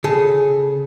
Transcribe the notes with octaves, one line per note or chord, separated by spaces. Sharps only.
C#3 G#4 A4